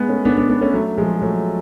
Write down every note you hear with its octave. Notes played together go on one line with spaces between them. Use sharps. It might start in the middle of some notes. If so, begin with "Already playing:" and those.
Already playing: G#3 B3
A3 C#4
B3 D4
B3 D4
B3 D4
A3 C#4
F#3 A3
F3 G#3
F#3 A3